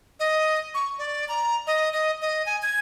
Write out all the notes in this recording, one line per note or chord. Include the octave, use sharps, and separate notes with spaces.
D#5
C#6
D5
A#5
D#5
D#5
D#5
G#5
G#6